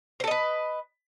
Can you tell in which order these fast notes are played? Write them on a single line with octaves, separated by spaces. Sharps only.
C5 A4 D#5 B4